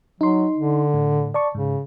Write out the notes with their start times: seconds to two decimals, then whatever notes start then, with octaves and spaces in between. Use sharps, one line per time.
0.21 F#3 D#4 C6
0.56 D3
0.94 A2
1.34 D5 A5 C#6
1.55 G#2 C#3